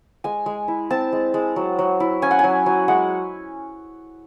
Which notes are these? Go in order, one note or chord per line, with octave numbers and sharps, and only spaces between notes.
G#3 G#5
G#3
E4
C4 A5
G#3
G#3
F#3
F#3
E4
C#4 G#5
F#5
G#5
F#3
F#3
G#3 F#5